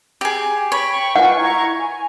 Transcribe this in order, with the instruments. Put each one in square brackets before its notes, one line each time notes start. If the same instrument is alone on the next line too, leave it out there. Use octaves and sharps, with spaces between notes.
[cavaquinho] G4 G#4
[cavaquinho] C#5 [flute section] G5 [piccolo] B5
[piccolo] C#6
[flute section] F4 B4 G#5 [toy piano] F#5
[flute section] E4 A#5 G#6
G#5